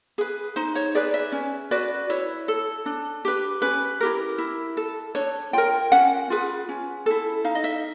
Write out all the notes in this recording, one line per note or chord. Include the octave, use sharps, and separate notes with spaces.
G#4 B4
D#4 C5
C#5
G#4 B4 D5
E5
C#4
F#4 B4 D5
E4 C#5
A4
D4
G4 B4
C#4 B4
E4 G4 A#4
E4
A4
D4 C#5
F4 A#4 G5
C#4 F#5
F4 G#4 B4
C#4
E4 A4
D#4 F5
D#5
E5